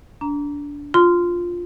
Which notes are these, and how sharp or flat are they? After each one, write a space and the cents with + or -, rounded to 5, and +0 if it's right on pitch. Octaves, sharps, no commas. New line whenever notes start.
D4 -20 A#5 +0
F4 +5 C6 -15